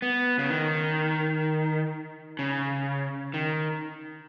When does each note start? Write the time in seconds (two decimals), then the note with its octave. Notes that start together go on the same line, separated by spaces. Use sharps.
0.02 B3
0.39 C#3
0.50 D#3
2.39 C#3
3.34 D#3